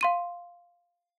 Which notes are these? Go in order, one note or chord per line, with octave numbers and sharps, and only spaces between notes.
F5 C6 D#7